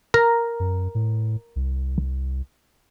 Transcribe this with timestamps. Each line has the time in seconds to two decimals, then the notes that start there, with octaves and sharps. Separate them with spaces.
0.14 A#4 A#5
0.60 F#2
0.95 A2
1.56 C2